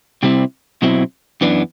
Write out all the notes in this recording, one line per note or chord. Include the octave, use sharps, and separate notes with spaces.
C3 G3 C4 E4
B2 F#3 C4 E4
F#2 E3 B3 D4